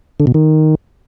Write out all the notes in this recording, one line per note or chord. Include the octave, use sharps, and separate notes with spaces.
D3
B2
D#3